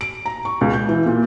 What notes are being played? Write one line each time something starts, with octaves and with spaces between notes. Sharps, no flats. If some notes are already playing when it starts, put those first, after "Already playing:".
D7
A#5
C#6
C#2
G6
E3
A#2